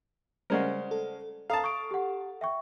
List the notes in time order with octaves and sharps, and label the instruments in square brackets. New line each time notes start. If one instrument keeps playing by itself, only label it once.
[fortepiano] C#3 G#3 A#4 [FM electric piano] G3 C#4 [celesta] C5 D5 F#5
[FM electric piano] A4
[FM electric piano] A4 [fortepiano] F5 A5 [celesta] A#5 D#6
[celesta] C#6 D#6 D7
G4 F#5
E5 G5 C#6